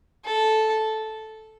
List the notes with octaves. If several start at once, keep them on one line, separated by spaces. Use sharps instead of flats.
A4